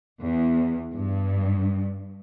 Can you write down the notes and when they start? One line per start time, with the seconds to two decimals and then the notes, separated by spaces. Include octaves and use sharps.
0.21 E2
0.94 G2